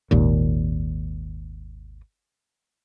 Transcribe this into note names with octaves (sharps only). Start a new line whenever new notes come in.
G#1 D#2 A#2